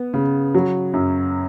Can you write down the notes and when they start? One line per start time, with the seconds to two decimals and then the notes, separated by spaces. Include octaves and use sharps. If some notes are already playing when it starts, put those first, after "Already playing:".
Already playing: B3
0.14 C#3
0.55 F#3
0.94 F#2